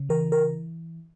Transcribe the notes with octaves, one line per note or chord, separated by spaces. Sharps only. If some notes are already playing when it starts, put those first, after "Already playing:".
Already playing: C#3
E3 A#4
A#4